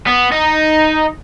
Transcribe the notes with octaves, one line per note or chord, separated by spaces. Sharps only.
B3
D#4